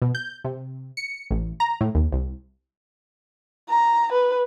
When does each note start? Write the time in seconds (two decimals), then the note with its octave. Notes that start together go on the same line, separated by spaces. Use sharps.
0.02 B2
0.15 G6
0.44 C3
0.97 C#7
1.31 A1
1.60 A#5
1.81 A2
1.95 D#2
2.12 C2
3.69 A#5
4.12 B4